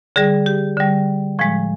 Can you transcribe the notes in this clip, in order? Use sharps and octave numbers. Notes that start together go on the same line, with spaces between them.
D3 G3 G#4
G4
D3 G3
A2 F3 G#3